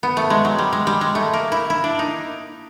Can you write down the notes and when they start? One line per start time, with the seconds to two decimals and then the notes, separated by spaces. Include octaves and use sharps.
0.03 B3
0.17 A3
0.30 G#3
0.45 F#3
0.58 G3
0.73 G#3
0.87 G3
1.01 G#3
1.15 A3
1.33 A#3
1.52 E4
1.70 E4
1.84 D4
1.99 D#4